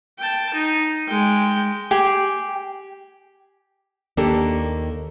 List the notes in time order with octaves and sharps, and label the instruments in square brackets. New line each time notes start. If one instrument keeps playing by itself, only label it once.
[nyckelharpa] G5 A5
D#4
G#3 G5
[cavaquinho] G4 G#4 G5
[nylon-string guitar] D#2 A#3 D4 G4 A4